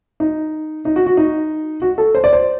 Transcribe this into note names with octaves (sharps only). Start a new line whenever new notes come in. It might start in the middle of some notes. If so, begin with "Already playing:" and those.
D#4
D#4
F#4
F#4
D#4
F#4
A4
C5
D5
C5